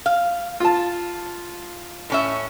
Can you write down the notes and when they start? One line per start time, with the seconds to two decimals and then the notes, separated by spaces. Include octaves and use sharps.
0.06 F5
0.60 F4 A5
2.10 A2 C#4 E5